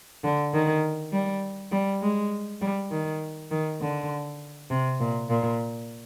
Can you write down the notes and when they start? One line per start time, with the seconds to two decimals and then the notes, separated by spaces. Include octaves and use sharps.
0.24 D3
0.53 D#3
1.13 G3
1.72 G3
2.02 G#3
2.61 G3
2.91 D#3
3.51 D#3
3.81 D3
4.70 C3
5.00 A#2
5.30 A#2